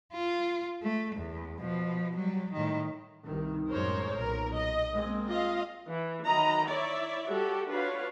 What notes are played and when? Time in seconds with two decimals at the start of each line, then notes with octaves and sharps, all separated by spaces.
0.13 F4
0.82 A3
1.16 E2
1.60 B2 F3
2.16 F#3 G3
2.53 A2 D#3
3.25 C2 G2 D#3
3.69 F#2 A2 G#3 A#4 C5 C#5
4.14 B1 A#2 A#4
4.56 D#5
4.95 G#3 A#3 C4
5.27 F4 D#5 F5
5.88 E3
6.25 D#3 E3 F#3 D#5 A#5 B5
6.69 E4 C#5 D5 E5
7.28 G3 F#4 G4 A4
7.69 D4 F4 F#4 B4 C#5 F5